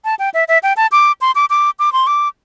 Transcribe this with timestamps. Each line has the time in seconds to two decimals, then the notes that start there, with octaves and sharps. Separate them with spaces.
0.05 A5
0.19 G5
0.34 E5
0.48 E5
0.63 G5
0.77 A5
0.92 D6
1.21 C6
1.35 D6
1.50 D6
1.79 D6
1.93 C6
2.07 D6